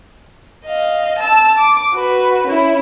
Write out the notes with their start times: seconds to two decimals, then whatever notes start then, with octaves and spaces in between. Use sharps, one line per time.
0.66 D#5 F5
1.19 A5 E6
1.58 D6
1.94 F#4 B4
2.47 C#4 E4